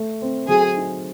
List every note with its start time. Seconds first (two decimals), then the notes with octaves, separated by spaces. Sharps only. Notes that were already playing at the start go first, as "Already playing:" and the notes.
Already playing: A3
0.22 C4
0.48 F#3 G#4
0.77 D#4